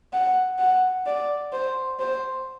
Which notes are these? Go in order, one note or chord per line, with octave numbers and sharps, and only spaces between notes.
F#5
F#5
D5
C5
C5